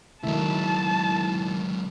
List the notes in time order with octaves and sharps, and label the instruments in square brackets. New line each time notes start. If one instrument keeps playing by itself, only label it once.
[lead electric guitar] C#2 F#3 [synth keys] D#3 A3 E4 [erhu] A5